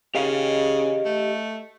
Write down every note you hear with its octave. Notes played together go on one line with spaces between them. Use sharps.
C#3 G4 D#5 F5
A3